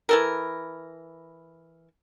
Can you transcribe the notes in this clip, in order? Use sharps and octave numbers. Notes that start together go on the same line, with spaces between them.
E3 A4 A#4